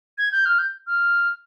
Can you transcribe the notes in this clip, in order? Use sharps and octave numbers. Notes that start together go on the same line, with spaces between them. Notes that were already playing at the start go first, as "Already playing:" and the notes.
G#6
G6
F6
G6
F6